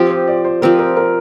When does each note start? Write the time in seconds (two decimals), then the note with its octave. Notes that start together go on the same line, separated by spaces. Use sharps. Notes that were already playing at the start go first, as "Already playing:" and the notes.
Already playing: F3 C4 G4
0.10 C5
0.28 D5
0.45 C5
0.62 F3 C4 G4 A#4
0.79 A#4
0.97 A#4